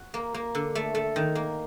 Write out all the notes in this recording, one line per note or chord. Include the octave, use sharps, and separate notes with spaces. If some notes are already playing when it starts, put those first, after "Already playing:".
Already playing: F#4
A#3
A#3
D3
A3
A3
D#3
A#3